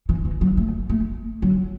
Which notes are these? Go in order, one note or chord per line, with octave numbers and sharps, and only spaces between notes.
E3
E3
F#3
A3
A3
F#3